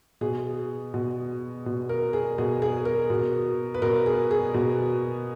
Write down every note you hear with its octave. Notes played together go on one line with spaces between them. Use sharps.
B2 G#4
B2
B2
A#4
G#4
B2 G#4
G#4
A#4
B2
B4
B2 A#4
G#4
G#4
B2